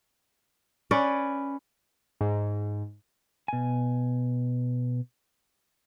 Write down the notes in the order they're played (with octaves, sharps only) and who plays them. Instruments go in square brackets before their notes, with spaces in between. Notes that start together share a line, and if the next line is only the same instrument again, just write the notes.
[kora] C#4 B4 C#5 D5
[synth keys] G#2
[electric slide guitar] B2 G#5